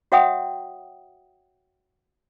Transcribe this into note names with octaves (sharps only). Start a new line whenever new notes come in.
F#4 C#5 E5 F#5 G5 D#6